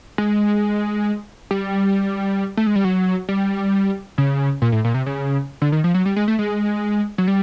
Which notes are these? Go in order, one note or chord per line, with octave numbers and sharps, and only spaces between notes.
G#3
G3
A3
G#3
G3
F#3
G3
C#3
A#2
A2
A#2
C3
C#3
D3
D#3
F3
F#3
G3
G#3
A3
G#3
F#3
G3